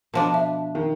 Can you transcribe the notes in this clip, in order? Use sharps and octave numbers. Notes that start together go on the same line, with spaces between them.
B2 F3 D4
E5
D#3